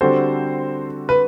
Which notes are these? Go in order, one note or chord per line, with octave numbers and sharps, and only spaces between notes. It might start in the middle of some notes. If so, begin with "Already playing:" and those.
D3 G3 C4 F#4 A4 C5
B4